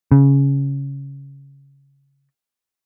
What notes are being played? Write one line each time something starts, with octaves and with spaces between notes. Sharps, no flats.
C#3